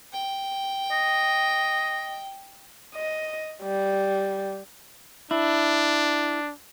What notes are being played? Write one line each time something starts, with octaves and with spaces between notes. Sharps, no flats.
G5
D#5
D#5
G3
D4 E4